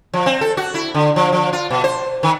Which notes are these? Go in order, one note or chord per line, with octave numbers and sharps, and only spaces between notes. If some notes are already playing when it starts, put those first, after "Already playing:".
F3
C4
A4
F#4
E4
D3
F3
F3
F4
B2
C5
D#3